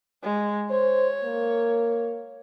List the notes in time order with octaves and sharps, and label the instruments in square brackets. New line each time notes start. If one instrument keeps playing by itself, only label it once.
[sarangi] G#3
[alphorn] C5 [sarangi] C#5
[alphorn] A#3